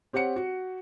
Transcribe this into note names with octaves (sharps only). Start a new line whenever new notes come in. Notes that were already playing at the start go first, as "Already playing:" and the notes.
C4 G4 C#5 F#5 C#7
F#4